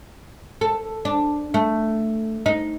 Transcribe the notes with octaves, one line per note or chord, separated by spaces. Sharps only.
A4
D4
A3
D#4